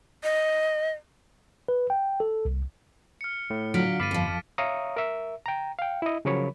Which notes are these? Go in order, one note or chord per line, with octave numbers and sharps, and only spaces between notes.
D#5
B4
G5
A4
C2
F6 C#7
A2
D3 F#3 F4 F6 B6 D7
G1 F5 B5 D6 A6 D#7
F2 F3
C#5 E5 F5 A#5 C#6 D#6
A#4 E5
G5 A#5
F5 G5
E4 D#5
C#3 F3 F#3 A#4 C#5 B5